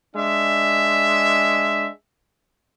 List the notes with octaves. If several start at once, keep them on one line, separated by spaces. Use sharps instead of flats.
G#3 D4 E5